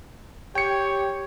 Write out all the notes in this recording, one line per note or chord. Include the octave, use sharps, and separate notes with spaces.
G4 C#5 G5 C#7